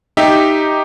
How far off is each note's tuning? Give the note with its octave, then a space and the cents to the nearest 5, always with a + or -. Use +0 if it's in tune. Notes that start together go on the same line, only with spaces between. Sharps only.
D#4 +0 G4 +0 E5 +0